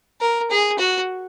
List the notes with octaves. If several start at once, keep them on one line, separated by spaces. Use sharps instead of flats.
A#4
G#4
F#4